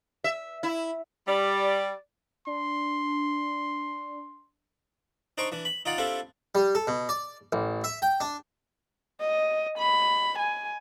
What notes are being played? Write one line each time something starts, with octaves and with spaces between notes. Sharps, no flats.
E5
E4
G3 D5
D4 C6
D4 D#4 C5 G5 C#6
E3 D4
B5
D#4 F4 D5 F#5
C4 D4 E4 F4 G4 A4
G3
A4
B2
D5
A1
E5
G5
D4
D#5
B5
G#5